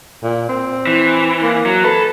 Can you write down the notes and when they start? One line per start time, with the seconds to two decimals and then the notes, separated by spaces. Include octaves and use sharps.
0.24 A#2
0.49 C4
0.87 E3
1.43 A#3
1.66 F#3
1.84 A4 B4